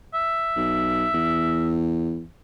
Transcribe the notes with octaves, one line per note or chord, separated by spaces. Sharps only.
E5
B1
E2